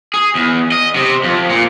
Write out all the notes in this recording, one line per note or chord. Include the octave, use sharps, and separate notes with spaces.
G#4
E2
D#5
C3
F2
A#2